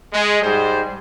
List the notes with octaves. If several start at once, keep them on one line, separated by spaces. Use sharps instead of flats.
G#3
G#2 G3 G#4 C5